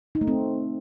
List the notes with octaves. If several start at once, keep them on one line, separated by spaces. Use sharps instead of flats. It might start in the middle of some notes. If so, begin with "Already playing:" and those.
D#4
A3
C4